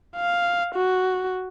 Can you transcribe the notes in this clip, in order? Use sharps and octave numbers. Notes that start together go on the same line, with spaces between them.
F5
F#4